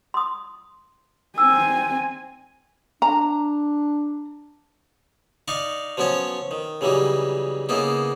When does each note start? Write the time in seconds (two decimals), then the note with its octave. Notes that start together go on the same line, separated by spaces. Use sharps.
0.14 C6 D#6
1.38 C4 G#5 E6
3.02 D4 A#5
5.48 D#4 D5 F5 C#6
5.97 F3 F#3 B3 C#4 C#5
6.51 D#3
6.81 C#3 E3 F#3 G3 D#4
7.69 C#3 A#3 B3 D#4 E4